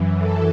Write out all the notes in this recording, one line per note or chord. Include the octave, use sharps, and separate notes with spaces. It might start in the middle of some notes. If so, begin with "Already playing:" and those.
Already playing: F#2 E3
A4